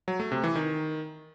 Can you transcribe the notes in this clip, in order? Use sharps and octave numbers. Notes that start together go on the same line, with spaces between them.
F#3
A3
C3
E3
D#3